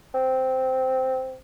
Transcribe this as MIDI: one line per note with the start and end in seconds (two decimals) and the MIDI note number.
0.14 1.36 60